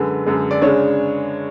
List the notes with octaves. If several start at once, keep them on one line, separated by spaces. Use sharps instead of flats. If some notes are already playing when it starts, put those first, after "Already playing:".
Already playing: F#2 D3 G#3 B4
F#2 D3 G#3
D5
C#3 G#3 D4 C#5